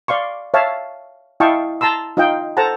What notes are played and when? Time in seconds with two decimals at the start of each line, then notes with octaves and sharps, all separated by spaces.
0.08 D5 F5 C6 C#6
0.54 C#5 E5 F5 A5
1.40 E4 D#5 F5 G5 A5 C#6
1.81 A5 A#5 C6 E6
2.17 D#4 F4 D#5 F5 G5
2.57 A4 C5 F#5 A5 A#5